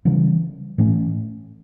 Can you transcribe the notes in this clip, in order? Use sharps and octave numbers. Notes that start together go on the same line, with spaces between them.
C#3 E3 G3
A2 E3 A3 C#4